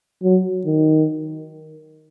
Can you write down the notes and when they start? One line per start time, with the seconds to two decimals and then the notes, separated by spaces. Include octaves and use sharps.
0.23 F#3
0.66 D#3